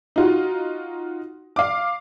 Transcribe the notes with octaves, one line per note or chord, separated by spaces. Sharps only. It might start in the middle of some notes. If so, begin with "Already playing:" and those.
D#4 F4 F#4
F5 D6